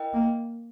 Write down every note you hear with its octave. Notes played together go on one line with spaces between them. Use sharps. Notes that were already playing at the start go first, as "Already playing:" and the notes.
Already playing: E4 A#4 D#5 G5
A#3